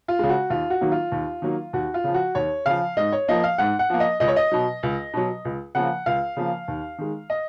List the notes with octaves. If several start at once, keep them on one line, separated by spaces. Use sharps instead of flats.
F4
C#3 G#3
F#4
D#2 F4
F#4
D#3 F#3 A#3
F4
D#2
D#3 F#3 A#3
D#2 F#4
F4
C#3 F3
F#4
D#2 C#5
C#3 F3 F5
G#2 D#5
C#5
F3 A#3 D#5
F5
G#2 F#5
F#5
F3 A#3
D#5
C#2 D#5
C#5
D#5
B2 F#3
C#2
B2 F#3
C#2
C#3 F3 A#3 F#5
C#2 F5
C#3 F3 A#3
D#2
D#3 G#3
D#5